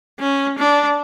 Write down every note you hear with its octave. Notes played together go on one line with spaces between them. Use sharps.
C#4
D4